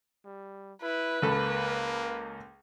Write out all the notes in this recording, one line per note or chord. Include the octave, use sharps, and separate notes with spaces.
G3
E4 B4
C#2 A#3 A4 B5